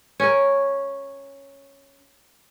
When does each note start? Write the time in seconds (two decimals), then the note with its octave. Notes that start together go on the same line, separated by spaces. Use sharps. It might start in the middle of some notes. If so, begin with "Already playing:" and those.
0.20 C#4 A#4